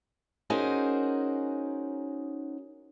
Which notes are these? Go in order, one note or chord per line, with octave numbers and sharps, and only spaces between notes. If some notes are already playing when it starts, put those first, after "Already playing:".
C#4 D#4 F#4 G#4 A#4 C5